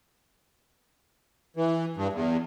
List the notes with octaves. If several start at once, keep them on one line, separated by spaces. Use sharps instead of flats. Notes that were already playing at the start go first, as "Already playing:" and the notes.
E3
G2
E2